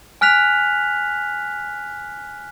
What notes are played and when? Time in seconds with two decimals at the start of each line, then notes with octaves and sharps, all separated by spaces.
0.21 G#5 F6 F#6 B6 F7